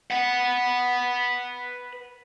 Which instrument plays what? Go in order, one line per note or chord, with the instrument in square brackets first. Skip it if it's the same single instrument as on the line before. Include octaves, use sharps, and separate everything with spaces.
[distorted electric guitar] B4 F#5